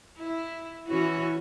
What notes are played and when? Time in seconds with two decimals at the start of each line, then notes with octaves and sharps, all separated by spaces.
0.18 E4
0.87 E3 C#4 E4 F#4